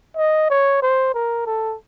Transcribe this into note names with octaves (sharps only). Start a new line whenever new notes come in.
D#5
C#5
C5
A#4
A4